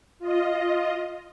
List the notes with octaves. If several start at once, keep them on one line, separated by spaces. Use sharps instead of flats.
F4 D#5